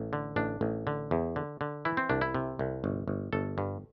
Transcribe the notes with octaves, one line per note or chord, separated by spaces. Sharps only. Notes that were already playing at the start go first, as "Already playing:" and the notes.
Already playing: A1
D3
A1 D4
A1
D3
E2
D3
D3
E3 E4
C4
C2 D4
E4
C3
C2
G1
G1
G1 A4
G2